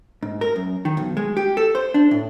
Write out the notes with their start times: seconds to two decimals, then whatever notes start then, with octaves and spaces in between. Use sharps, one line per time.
0.22 G#2
0.41 A#4
0.56 F#2
0.85 D#3
0.97 B1
1.17 G#3
1.37 G4
1.57 A4
1.75 C5
1.94 D4
2.11 A2